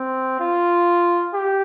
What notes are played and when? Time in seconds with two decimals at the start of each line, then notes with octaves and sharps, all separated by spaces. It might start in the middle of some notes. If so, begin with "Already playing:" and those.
Already playing: C4
0.40 F4
1.34 G4